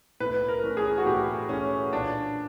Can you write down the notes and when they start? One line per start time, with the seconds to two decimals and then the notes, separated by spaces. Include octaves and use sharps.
0.20 A2 B4
0.48 A#4
0.63 E3 A3 C#4
0.77 G#4
0.98 F#4
1.06 A2 G4
1.49 E3 A3 C#4
1.92 A#2 D4